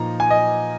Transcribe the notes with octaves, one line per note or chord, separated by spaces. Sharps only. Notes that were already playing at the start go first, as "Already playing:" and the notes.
Already playing: A#2 F3 A#3 D#4 A#5
G#5
D#5